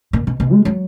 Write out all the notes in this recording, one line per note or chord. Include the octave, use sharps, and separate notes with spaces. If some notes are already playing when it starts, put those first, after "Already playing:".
A#2
B2
B2
G#3
F#3